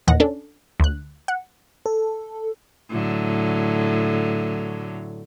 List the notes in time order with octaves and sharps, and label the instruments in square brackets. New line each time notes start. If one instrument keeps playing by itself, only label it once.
[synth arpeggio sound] D#2 A#2 E3 D#5 F#5 A#6
C#4 D4 A4
D2 F#6
F#5
[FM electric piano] A4
[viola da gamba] A2 D3 F#3